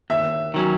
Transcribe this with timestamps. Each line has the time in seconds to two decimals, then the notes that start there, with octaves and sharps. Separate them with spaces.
0.10 D#2 E5
0.54 D#3 F#3 C#4